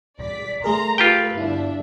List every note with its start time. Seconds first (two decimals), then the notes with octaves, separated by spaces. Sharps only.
0.20 D5 B6
0.64 A3 G#4 A#4 A#5 C6
0.98 F4 G4 A4 B4 G5
1.37 G1 D4 E4 E5